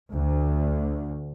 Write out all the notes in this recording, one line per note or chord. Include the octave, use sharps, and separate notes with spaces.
D2